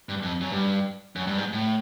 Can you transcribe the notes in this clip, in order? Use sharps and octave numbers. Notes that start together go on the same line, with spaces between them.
G2
F2
F#2
G2
F#2
G2
G#2
A2